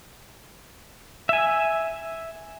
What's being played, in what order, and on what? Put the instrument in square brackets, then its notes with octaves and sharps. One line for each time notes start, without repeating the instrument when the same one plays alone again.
[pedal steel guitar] E5 G#5